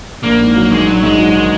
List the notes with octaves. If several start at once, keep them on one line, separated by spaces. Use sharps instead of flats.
A#1 A#3
G#2
F#3
D#3 G#3
A#1 F#3
G#2 G#3
F#3
D#3